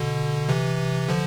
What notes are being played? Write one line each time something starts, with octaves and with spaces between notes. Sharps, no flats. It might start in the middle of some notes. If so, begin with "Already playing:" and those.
Already playing: B2 D3
C3 E3
D3 F3